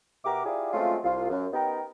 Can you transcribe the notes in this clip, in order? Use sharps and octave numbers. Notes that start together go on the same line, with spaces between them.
B2 F#4 G4 A#4 E5 D6
E4 F4 G4 G#4 D5
F#3 G#3 A3 C4 C#4 F4
C2 F4
F#2
B3 D#4 G4 A#4 G5